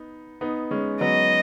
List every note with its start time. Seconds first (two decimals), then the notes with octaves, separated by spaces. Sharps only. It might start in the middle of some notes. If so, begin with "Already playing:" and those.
Already playing: B3 D#4
0.41 B3 D#4
0.71 G#3 C#4
1.00 F#3 B3 D#5